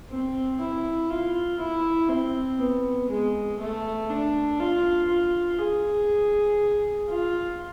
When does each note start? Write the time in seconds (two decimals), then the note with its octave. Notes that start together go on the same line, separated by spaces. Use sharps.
0.10 C4
0.60 E4
1.10 F4
1.59 E4
2.09 C4
2.59 B3
3.10 G#3
3.59 A3
4.10 D4
4.60 F4
5.09 F4
5.59 G#4
7.09 F4